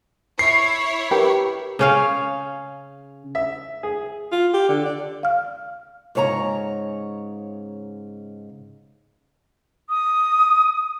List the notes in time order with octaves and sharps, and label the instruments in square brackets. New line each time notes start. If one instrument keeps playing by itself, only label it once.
[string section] E4 C#5 [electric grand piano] C7
[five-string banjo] G4 [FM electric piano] A#4 B4
[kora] C#3 C#4 F5
[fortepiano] E5
G#4
[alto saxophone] F4
G4
D3
D5
[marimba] F5 F6
[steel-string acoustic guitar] G#2 C#3 C#5 A5 A#5
[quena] D#6